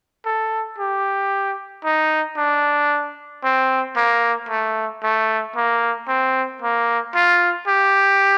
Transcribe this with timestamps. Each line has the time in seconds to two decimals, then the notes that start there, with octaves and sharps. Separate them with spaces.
0.26 A4
0.78 G4
1.84 D#4
2.37 D4
3.44 C4
3.96 A#3
4.49 A3
5.03 A3
5.56 A#3
6.08 C4
6.62 A#3
7.15 F4
7.67 G4